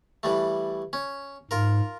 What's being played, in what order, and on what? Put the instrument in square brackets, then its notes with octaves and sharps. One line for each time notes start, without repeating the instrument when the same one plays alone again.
[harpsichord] E3 G3 A3
C#4
[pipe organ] G#2 [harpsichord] F4 A#4